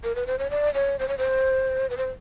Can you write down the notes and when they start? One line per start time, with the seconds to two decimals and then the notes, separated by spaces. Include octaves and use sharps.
0.04 A#4
0.15 B4
0.27 C5
0.39 C#5
0.50 D5
0.74 C#5
0.99 C5
1.08 C#5
1.18 C5
1.90 B4
1.97 C5